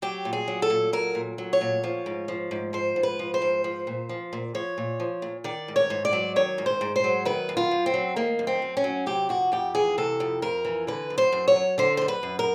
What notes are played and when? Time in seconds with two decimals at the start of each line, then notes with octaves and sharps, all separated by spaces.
0.02 F#3 G4
0.25 A#2
0.33 G#4
0.48 F#3
0.62 A4
0.70 A#2
0.93 F#3 A#4
1.15 A#2
1.38 F#3
1.53 C#5
1.61 A#2
1.84 F3
2.06 G#2
2.28 F3
2.51 G#2
2.73 F3 C5
2.96 G#2
3.03 B4
3.19 F3
3.34 C5
3.42 G#2
3.64 F3
3.87 A#2
4.09 F3
4.33 A#2
4.55 F3 C#5
4.78 A#2
5.00 F3
5.22 A#2
5.44 D#3 D5
5.68 G#2
5.76 C#5
5.90 G#2
6.05 D5
6.13 F#3
6.36 D#3 C#5
6.58 G#2
6.66 C5
6.81 G#2
6.96 C5
7.04 F#3
7.25 D#3 B4
7.49 F#2
7.57 F4
7.71 F#2
7.86 C4
7.94 F#3
8.16 D#3 A#3
8.39 F#2
8.47 C4
8.62 F#2
8.77 C#4
8.84 F#3
9.06 C3 G4
9.29 F2 F#4
9.52 F2 G4
9.75 E3 G#4
9.98 C3 A4
10.20 F2
10.42 F2 A#4
10.65 E3
10.87 D3 B4
11.10 F#2
11.18 C5
11.32 F#2
11.48 C#5
11.56 F#3
11.78 D3 C5
11.97 F#2 C5
12.08 B4
12.23 F#2
12.39 A#4